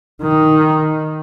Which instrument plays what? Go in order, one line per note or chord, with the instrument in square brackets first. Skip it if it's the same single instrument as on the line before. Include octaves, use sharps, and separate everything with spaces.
[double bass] D#3